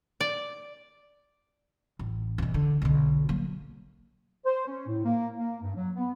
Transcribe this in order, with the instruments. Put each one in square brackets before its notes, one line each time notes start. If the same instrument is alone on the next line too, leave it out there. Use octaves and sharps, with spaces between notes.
[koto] D5
[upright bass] A1
E2 B2
D3
B1 D3
F#3 A#3
[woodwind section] C5
C#4
A2
A#3
A#3
G2
F#3
B3